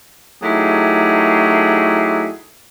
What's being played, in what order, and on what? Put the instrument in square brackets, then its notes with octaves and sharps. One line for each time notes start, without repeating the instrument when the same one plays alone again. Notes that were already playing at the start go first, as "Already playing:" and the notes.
[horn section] F#3 A3 D#4 E4 G4 G#4